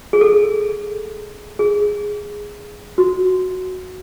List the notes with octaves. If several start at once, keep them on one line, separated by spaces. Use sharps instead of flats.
G#4
A4
G#4
F#4